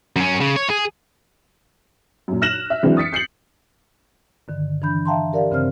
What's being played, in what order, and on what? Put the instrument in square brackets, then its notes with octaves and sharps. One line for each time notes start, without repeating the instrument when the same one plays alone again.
[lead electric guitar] F#2 C#4
C#3
C#5
G#4
[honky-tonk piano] F#2 A#2
F6 F#6 A#6 E7 F#7
E5
E3 F#3 G#3 C4 D4
D#6 A6 B6 C#7
G6 C7 C#7 F#7
[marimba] G2 D3 D#3
E3 D4 B5 G6
E5 F5 G5 A5 A#5 C6
G4 A#4 D5 F5
G2 C#3 C4 C5 F6